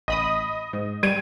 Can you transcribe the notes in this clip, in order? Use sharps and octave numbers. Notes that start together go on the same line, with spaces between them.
A1 D#5 B5 D#6
G#2
G3 G#6 D7 D#7